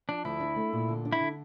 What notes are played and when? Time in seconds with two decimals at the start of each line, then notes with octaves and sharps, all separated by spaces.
0.09 F3 D4
0.25 D2 E4
0.40 D4
0.56 A3
0.73 A#2
0.89 D3
1.05 D4
1.12 E4
1.21 D3